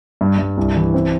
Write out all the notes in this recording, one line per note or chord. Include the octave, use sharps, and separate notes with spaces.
G2
G2
C2
E3
C4